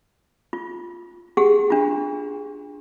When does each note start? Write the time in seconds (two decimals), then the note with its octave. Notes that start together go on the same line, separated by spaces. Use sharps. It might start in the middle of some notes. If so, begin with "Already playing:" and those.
0.53 F4
1.37 G4 G#4 F#5
1.70 D4 F4